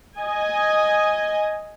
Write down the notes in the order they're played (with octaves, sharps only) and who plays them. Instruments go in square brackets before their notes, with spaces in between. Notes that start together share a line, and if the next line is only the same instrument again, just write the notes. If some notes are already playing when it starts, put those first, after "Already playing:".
[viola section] D#5 G#5